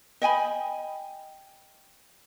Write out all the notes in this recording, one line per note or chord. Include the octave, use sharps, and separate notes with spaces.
D#5 G5 G#5 B5